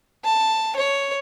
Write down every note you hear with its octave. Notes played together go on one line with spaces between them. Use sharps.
A5
C#5